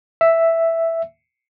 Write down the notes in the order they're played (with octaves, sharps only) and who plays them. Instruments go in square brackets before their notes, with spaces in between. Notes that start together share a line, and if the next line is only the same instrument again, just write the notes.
[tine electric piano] E5